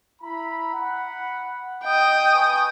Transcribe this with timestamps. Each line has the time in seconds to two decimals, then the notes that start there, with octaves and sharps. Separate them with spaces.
0.22 E4 A#5 B5
0.74 F#5 B5
1.85 D#5 G5 D#6
2.33 B4 G#5 C#6